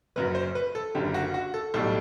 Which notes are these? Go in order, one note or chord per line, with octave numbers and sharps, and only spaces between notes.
F#1 F#2 F#3 B4
C5
B4
A4
F#1 F#2 D3 G4
F#4
F#4
A4
B1 A2 G3 A4